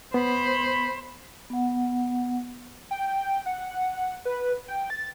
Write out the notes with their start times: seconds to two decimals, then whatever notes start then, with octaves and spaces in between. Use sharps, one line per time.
0.14 B3 C5 B5
1.50 B3 F#5
2.91 G5
3.46 F#5
4.25 B4
4.68 G5
4.90 A6